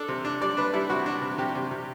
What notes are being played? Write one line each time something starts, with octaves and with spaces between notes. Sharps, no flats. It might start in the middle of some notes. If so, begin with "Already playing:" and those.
Already playing: D4 A4
C3
D4
G3 D5
D4 B4
G3 E4
C3 F#4
D4
C3
C3 G4
C3
C3